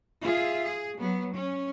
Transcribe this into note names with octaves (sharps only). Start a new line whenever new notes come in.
F4 G#4 E5
G#4
F#3 B3
C#4